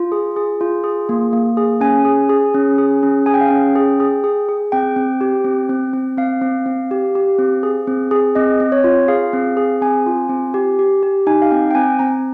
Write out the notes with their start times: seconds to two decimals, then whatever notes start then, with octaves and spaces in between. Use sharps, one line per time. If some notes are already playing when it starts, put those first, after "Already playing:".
Already playing: F4
0.12 G#4
0.36 G#4
0.61 F4
0.84 G#4
1.09 A#3
1.33 A#3
1.57 G#4
1.81 C#4 G#5
2.05 G#4
2.29 G#4
2.54 C#4
2.78 G#4
3.03 C#4
3.26 G#4 G#5
3.34 G5
3.41 F5
3.48 C#4 G5
3.75 G#4
4.00 G#4
4.24 G#4
4.49 G#4
4.72 C4 G5
4.96 C4
5.21 G4
5.44 C4
5.69 C4
5.93 C4
6.18 C4 F5
6.41 C4
6.66 C4
6.91 G4
7.15 G4
7.39 C4
7.63 G#4
7.87 C4
8.11 G#4
8.35 C4 D#5
8.60 C4
8.72 C#5
8.84 F4
9.08 G#4 F5
9.33 C4
9.57 G#4
9.82 C4 G#5
10.06 F4
10.29 C4
10.54 G4
10.79 G4
11.03 G4
11.27 D#4 G#5
11.42 F5
11.51 C4 G5
11.71 G5
11.75 C4 G#5
11.99 C4 A#5